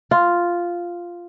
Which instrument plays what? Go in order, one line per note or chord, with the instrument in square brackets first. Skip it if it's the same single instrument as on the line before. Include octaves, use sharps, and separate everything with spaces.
[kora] F4